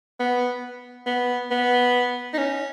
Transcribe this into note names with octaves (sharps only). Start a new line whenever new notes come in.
B3
B3
B3
D#4
C#4